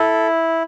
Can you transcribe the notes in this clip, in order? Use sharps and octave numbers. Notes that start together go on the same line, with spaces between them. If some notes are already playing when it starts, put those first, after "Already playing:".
Already playing: E4 A4